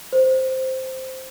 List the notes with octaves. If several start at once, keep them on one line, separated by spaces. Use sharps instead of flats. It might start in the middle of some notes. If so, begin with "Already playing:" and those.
C5